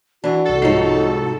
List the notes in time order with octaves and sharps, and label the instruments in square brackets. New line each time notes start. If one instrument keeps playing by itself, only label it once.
[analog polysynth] E3 [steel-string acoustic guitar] D4 [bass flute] F#4
[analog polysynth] C2 A4
[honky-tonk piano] G#2 F3 C7 [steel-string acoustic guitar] C#4 D#4